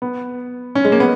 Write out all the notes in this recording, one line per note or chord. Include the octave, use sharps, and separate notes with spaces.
B3
C#4
G#3
A#3
B3